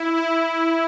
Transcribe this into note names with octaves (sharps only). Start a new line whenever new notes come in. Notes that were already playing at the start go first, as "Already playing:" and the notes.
Already playing: E4
E4